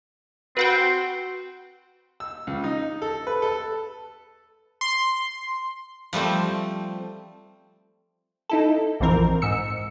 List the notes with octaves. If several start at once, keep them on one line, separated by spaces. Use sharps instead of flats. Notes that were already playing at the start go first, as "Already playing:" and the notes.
C4 F#4 B4 F#5 G5
E6
C#2
D#4
A4
B4
A4
C6
F3 G3 A3 C4
D#4 E4 A4
A#1 F2 E3 C4 A#4
G#2 E6 C#7